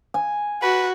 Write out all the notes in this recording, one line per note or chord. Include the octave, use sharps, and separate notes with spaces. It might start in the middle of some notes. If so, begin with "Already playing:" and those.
G#5
F#4 B4